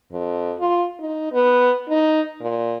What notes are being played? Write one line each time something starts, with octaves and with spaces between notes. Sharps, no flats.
F2
F4
D#4
B3
D#4
A#2